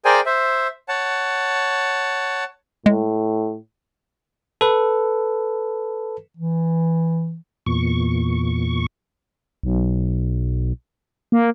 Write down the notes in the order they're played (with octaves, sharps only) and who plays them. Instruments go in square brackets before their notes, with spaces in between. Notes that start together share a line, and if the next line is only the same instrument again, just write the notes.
[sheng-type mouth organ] G#4 A#4 C5 D5 G5 G#5
C5 E5
C#5 F#5 A5
[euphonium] A2 [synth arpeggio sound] G#3
[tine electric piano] A4 B4
[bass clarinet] E3
[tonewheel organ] E2 A#2 C#6
[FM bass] B1
A#3